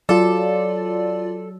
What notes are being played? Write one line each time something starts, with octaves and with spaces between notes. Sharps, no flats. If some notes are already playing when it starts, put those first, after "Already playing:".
F#3 F4 A4 D5